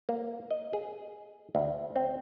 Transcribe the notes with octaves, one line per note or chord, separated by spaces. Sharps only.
A#3
D#5
G#4
D2
C4